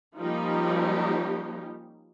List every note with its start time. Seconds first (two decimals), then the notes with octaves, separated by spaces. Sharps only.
0.18 F3 G3 A#3 C#4 D#4 G4